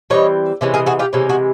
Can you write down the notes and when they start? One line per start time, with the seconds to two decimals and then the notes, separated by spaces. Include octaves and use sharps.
0.10 E3 G3 C4 C#5 D#5
0.61 C3 E3 G#3 C#4
0.74 G#4 A#4
0.86 F#4 G#4
0.99 F4 G4
1.13 C3 E3 G#3 C#4
1.29 F#4 G#4